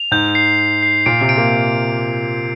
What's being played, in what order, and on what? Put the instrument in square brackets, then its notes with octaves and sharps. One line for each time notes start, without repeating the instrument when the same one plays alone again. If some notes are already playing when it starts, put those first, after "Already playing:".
Already playing: [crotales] F7
[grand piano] G#2 [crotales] G6
[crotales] C7
G6
C7
[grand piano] A#2 [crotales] D7
[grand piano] C3
[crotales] D7
[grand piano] A#3